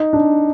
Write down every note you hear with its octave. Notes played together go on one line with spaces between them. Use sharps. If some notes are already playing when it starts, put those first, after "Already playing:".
Already playing: D#4
D4